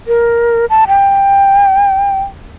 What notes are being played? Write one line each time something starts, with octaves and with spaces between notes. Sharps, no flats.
A#4
A5
G5